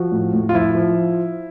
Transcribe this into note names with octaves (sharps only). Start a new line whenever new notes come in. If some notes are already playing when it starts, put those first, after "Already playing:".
Already playing: F3 F#4
A2
A2
F4
F3 E4
F3